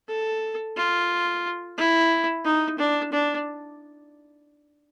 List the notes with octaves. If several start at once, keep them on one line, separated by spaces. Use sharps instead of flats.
A4
F4
E4
D#4
D4
D4